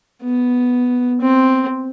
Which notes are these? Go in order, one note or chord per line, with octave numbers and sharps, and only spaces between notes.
B3
C4